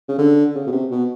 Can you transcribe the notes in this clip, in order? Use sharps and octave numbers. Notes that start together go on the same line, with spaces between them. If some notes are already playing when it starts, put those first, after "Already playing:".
C#3
D3
C#3
B2
C3
B2